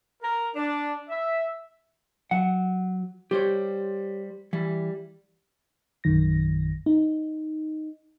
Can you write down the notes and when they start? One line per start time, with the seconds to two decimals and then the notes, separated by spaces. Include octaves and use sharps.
0.21 A#4
0.56 D4
1.10 E5
2.31 F#3 F#5
3.31 G3 G4 C5 C#5
4.53 E3 G3
6.04 A#1 F#2 D#3 A#6
6.86 D#4